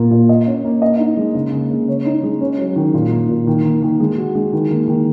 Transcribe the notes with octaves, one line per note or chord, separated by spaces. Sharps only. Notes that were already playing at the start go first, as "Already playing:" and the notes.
Already playing: A#2 A#3
A#2
D#5
C#4
A#3
D#5
D#4
G#3
C#3
A#3
C#3
C#5
D#4
G#3
C#4
F#3
D#3
A#2
A#3
A#2
D#3
A#3
D#3
G#3
F#4
G#3
D#3
A#3
D#3